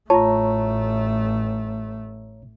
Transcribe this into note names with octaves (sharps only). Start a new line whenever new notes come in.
A1 A3 F4 C#5 A5 A#5